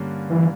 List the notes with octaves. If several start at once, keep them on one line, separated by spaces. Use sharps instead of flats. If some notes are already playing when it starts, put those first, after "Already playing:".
Already playing: G2 D3 A#3 C#4
E3